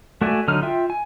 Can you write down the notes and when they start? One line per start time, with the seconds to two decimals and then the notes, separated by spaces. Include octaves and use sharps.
0.21 A3 F#4 D5 E5 G#5
0.48 D3 F#3 D#4 F6
0.62 F4 E5 G5
0.90 G#5